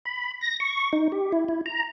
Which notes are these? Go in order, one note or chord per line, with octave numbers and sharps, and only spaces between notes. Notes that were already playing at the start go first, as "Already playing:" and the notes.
B5
A#6
C#6
D#4
G4
E4
E4
A#5